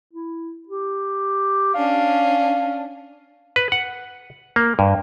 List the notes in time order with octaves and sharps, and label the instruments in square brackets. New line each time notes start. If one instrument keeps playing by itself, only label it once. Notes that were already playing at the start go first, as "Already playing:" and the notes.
[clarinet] E4
G4
[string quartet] C#4 D4 [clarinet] F5
[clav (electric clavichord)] B4
F#5
A#3
G2